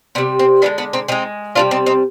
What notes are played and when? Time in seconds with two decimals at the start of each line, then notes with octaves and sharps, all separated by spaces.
0.15 C3 G3 B3 D4
0.39 C4
0.62 D3 F3 G#3 B3 D4
0.78 B3 D4
0.93 C4 D#4
1.08 D3 C4 D#4
1.12 G#3
1.55 C3 D#3 G3 D4 F4
1.71 C4 D#4
1.86 C4 D#4